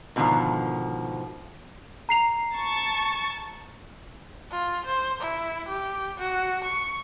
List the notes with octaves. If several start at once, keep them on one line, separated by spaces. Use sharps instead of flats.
G#2 B2 D3 D#3 F3
A#5 C7 F7
A5 C#6
F4
C5
E4
G4
F#4
C#6